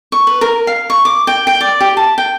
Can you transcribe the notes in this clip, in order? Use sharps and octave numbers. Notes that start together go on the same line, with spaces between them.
C#6
B4
A#4
F5
C#6
D6
G5
G5
D5
G4
A5
G5